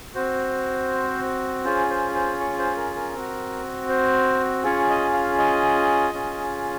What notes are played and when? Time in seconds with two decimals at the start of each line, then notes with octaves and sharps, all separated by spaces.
0.15 C4 F#4 C5
1.65 C#4 F4 G#4 C5
1.90 C5
2.15 C5
2.40 C#5
2.59 C5
2.77 A#4
2.96 A#4
3.15 C4 F#4
3.89 C5
4.64 C#4 F4 G#4 C#5
4.90 D#5
5.13 F5
5.38 D#5
6.14 C#4 F4 G#4